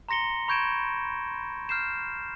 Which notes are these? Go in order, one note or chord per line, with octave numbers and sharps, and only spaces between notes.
A#5 C6 A#6 C#7 G7
B5 C#6 G6 G#6 D7 E7
F6 G6 C7 E7